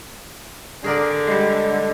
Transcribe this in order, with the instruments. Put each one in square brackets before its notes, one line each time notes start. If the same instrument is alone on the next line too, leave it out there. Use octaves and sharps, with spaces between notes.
[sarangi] D3 [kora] G#4 A#4 D5
[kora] G3 G#3